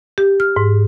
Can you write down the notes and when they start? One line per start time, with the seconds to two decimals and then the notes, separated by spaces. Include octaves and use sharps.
0.18 G4
0.40 F6
0.56 G#2